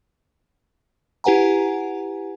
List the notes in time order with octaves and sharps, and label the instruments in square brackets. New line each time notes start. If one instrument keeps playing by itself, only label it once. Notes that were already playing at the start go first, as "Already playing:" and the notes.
[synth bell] E4 G4 B4 F#5 G#5 A#5